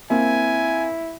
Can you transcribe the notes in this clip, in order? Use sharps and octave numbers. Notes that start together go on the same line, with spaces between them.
A#3 C4 E4 G#5